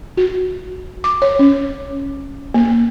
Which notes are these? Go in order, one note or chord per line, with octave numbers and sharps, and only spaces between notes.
F#4
D6
C#5
C#4
A#3